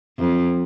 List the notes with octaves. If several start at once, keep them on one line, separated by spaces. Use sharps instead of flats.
F2